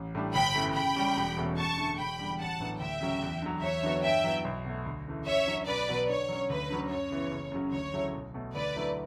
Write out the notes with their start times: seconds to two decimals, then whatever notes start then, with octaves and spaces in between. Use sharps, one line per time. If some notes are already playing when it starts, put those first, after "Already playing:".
Already playing: A1
0.15 A2 G3 D4 G4
0.34 G1 G5 B5
0.55 F#2 E3 A3
0.75 C#3 G5 B5
0.96 G3 C#4 G4
1.17 E1
1.37 E2 B2 A3 C#4
1.57 F#2 A5 C#6
1.78 D3 A3 D4
1.98 E1 G5 B5
2.19 E2 D3 G3
2.39 A1 F#5 A5
2.60 A2 F#3 B3 D4
2.80 D2 E5 G5
3.01 C#3 F#3 C#4
3.22 E2
3.42 D3 F#3
3.62 E2 C#5 E5
3.83 D3 F#3 B3 F#4
4.03 G2 E5 G5
4.24 F#3 B3 E4
4.45 B1
4.65 B2 A3
4.86 D2
5.06 C#3 E3 A3
5.26 F#2 C#5 E5
5.47 D3 F#3 C#4
5.67 B1 B4 D5
5.89 B2 F#3
6.09 D3 C#5
6.28 F#3 C#4
6.50 D2 B4
6.70 D3 F#3 C#4
6.91 F#2 C#5
7.11 C#3 E3 B3
7.31 F#1
7.52 F#2 C#3 F#3 C#4
7.72 D2 C#5
7.94 C#3 F#3 A3 E4
8.13 B1
8.34 B2 A3
8.54 D2 B4 D5
8.75 D3 F#3 A3 E4